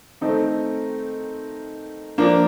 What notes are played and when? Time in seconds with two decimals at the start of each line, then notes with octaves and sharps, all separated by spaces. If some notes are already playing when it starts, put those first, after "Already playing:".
0.21 D#3 A3 C4 D#4 A4
2.18 F3 A#3 D4